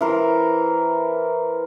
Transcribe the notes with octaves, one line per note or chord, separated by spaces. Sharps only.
E3 A#4 C5